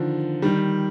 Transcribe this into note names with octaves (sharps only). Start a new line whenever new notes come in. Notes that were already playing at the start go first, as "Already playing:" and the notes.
Already playing: D3 D#3 F3
D#3 G3